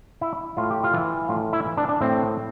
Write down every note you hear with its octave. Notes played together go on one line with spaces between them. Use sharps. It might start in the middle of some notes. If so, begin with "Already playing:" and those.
E4
A2 F4
G4
F4
E3
A2 F4
E4
E3
D4
D4
A2 C4